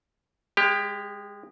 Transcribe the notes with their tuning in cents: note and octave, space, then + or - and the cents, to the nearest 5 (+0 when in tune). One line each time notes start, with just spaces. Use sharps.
G#3 -20 G4 +15